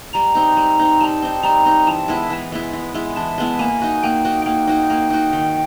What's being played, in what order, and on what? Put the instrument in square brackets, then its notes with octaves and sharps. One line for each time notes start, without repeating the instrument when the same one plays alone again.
[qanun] G3 [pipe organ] A#5
[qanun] C4 D#4
G3
C4 D#4
[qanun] G3 [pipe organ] A5
[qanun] C4 D#4
[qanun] G3 [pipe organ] A#5
[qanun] C4 D#4
[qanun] E3 [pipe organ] A5
[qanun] G#3 B3 E4
E3
G#3 B3 E4
E3
G#3 B3 E4
[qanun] E3 [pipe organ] A5
[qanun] G#3 B3 E4
[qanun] A#3 [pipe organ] G#5
[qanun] D#4 F#4
[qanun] A#3 [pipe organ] G5
[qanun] D#4 F#4
[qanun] A#3 [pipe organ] G5
[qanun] D#4 F#4
A#3
D#4 F#4
D#3